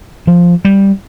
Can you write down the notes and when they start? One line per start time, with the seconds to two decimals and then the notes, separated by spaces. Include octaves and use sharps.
0.27 F3
0.65 G3